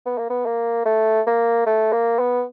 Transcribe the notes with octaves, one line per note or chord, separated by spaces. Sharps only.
B3
A#3
B3
A#3
A3
A#3
A3
A#3
B3